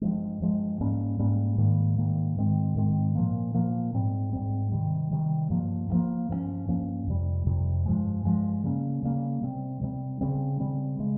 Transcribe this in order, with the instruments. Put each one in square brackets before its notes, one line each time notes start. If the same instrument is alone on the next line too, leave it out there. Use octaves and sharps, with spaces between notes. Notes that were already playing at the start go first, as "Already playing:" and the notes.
[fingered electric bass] G2 F3 G#3
G2 F3 G#3
G#2 G3 A#3 C#4
G#2 G3 A#3 C#4
G#2 D#3 G3 A#3
G#2 D#3 G3 A#3
G#2 D#3 G#3 C4
G#2 D#3 G#3 C4
A#2 F3 A#3
A#2 F3 A#3
G#2 G3 C4
G#2 G3 C4
C3 D#3 G3
C3 D#3 G3
G2 F3 A#3
G2
F3 A#3
G2 F3 A#3 C#4
G2 F3 A#3 C#4
F2 C3 G3
F2 C3 G3
G2 F3 G#3
G2 F3 G#3
C#3 G3 A#3 C#4
C#3 G3 A#3 C#4
C3 G3 C4
C3 G3 C4
C#3 G3 C4
C#3 G3 C4
C#3 G#3